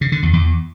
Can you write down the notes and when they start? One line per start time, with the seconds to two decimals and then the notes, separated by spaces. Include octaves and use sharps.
0.01 C#3
0.12 D3
0.23 E2
0.33 E2